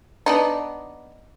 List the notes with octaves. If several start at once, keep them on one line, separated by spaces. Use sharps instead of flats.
B3 D4 D#4